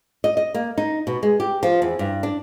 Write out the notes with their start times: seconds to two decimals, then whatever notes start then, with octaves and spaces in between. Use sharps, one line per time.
0.24 D#5
0.37 D#5
0.54 A#3
0.78 D#4
1.07 B2
1.23 G#3
1.40 G4
1.63 F3
1.82 E2
1.99 G2
2.23 D4